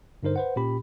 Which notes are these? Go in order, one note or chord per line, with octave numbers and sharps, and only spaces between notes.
G2 D3 D#4 A#4 C5
B4 C5 F#5
A#2 C#4 G4 B5